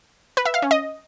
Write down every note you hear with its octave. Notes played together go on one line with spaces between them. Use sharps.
B4
E5
F5
C#4
D#5